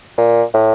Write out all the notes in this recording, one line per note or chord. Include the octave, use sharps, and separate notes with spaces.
A#2
A2